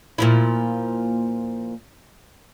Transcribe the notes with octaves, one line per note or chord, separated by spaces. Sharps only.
A#2 F3 E4